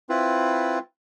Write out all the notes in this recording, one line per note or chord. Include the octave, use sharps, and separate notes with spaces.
C4 E4 F4 B4